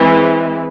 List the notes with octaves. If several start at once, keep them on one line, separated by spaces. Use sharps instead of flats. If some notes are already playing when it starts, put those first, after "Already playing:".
Already playing: E3 G#3 C4